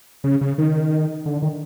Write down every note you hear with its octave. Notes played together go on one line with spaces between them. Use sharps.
C#3
C#3
D#3
D3
D#3